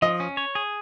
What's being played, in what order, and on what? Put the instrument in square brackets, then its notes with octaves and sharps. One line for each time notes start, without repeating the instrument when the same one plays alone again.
[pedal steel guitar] F3 [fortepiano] D#5
[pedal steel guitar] C#4
C#5
G#4